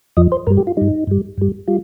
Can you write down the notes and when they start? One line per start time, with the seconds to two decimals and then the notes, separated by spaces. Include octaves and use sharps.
0.17 F2 F3 D#5
0.32 C5
0.47 G2 G3 A#4
0.57 G4
0.67 F4
0.77 G2 G3 D#4
1.07 G2 G3
1.38 G2 G3
1.68 G3 F4